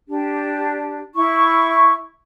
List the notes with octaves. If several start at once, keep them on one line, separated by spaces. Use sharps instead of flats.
D4 G4
E4 C#6